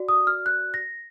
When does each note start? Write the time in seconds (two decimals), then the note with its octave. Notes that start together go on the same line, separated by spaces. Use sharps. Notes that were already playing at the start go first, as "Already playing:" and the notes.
Already playing: F#4 D5
0.09 D#6
0.27 F6
0.46 F#6
0.74 A#6